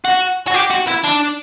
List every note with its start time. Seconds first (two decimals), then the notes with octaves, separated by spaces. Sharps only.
0.05 F#4
0.47 F#4
0.54 G4
0.70 F#4
0.87 E4
1.04 D4